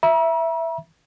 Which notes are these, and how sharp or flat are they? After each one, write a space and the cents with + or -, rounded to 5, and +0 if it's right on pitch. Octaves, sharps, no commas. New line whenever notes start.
E5 +5 A#5 +45